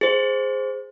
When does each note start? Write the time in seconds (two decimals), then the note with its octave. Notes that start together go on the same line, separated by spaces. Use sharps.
0.01 G#4 C5